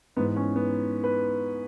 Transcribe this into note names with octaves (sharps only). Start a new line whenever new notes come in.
G#2 E3 B3
C#4
B3
B4